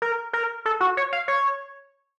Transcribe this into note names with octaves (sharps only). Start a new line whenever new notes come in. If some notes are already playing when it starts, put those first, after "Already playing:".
A#4
A#4
A4
F#4
C#5
F5
C#5